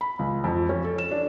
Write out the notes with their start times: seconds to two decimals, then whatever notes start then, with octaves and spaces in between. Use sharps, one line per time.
0.01 B5
0.19 C#2
0.44 F2
0.69 C#4
0.84 A4
0.98 E7
1.11 D4